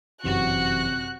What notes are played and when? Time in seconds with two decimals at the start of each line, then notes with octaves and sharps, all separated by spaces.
0.24 G1 F#2 C3 E3 F#4 F#6